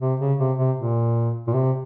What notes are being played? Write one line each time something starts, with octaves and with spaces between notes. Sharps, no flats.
C3
C#3
C3
C3
A#2
A#2
C3